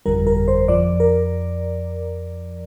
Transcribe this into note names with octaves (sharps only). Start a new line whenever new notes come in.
G1 F2 D3 G3 A#4
A#4
C5
F2 F3 D5
A#4